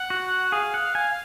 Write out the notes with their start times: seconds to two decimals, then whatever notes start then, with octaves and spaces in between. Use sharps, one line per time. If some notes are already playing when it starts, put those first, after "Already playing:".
Already playing: F#5
0.10 F#4
0.52 G#4 F5
0.74 F#5
0.95 G#5